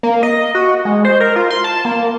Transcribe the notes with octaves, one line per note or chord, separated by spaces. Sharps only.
A#3
D#5
F#4
G#3
C5
A#4
F4
C6
A5
A#3